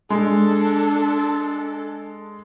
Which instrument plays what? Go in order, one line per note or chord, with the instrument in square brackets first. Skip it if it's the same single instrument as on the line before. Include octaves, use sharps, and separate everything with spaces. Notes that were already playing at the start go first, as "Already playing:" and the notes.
[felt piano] G#3 [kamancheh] D4 A4